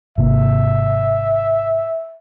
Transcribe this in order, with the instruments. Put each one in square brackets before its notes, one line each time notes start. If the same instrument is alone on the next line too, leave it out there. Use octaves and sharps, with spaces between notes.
[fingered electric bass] G#1 C3 A#3 [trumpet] E5